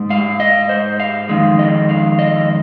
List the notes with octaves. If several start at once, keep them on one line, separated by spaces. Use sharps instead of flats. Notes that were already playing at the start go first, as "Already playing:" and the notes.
Already playing: G#2 G#3
F5
D#5
C5
F5
F2 D#3 G#3
D#5
F5
D#5